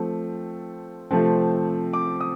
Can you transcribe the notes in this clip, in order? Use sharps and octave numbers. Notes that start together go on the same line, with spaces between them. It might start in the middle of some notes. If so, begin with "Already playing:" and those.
Already playing: F3 A3 C4
C3 F3 A3 C4
D6
D#6